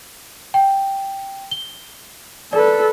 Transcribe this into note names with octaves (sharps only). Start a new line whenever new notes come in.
G5
G7
A4 B4 D5